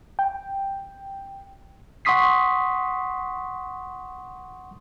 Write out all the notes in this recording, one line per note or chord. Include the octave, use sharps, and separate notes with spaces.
G5
F#5 C6 C#6 D#6 B6 C7